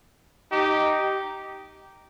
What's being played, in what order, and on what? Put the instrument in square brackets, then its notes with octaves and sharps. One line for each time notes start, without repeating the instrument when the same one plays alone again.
[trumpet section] D#4 G4